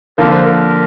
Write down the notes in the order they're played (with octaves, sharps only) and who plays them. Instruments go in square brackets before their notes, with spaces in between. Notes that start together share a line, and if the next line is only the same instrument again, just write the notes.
[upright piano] D3 F3 A#3 [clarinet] A#4
[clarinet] C5
A#4